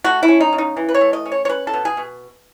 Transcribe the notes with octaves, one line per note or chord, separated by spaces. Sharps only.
A3 F#4
E4
C#4
D#4
C#3
D#4
E3
B4
C#5
A3
D#5
C#4
C#5
C#5
C#4 B4
A4
B2
G#4
B2